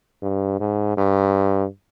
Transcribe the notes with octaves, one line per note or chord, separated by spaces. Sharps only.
G2
G#2
G2